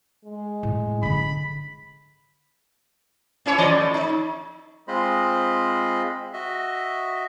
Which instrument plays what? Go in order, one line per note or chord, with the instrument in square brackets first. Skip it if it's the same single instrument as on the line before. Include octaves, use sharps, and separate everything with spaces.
[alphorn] G#3
[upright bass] A2
[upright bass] D3 D4 [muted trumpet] B5
[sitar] C#4 E4 C#5
E3 D5 D#5
A2
D#4
[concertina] G#3 C4 F4 C5 D#5 B5
F#4 D#5 E5